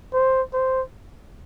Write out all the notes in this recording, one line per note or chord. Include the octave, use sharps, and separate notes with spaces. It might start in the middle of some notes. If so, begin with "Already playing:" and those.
C5
C5